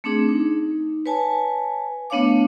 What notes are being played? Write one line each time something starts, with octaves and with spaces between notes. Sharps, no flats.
A3 C4 D4 G#4
D#4
B4 C#5 G#5 A5
A3 B3 D4 C#5 F5 D6